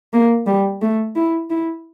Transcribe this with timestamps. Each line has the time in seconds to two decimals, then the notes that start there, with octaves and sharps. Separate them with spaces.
0.13 A#3
0.47 G3
0.82 A3
1.16 E4
1.50 E4